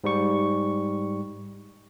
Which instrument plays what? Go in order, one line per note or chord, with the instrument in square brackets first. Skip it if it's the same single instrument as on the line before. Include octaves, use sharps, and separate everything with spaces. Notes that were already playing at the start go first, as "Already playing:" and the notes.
[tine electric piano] G#2 G3 C#6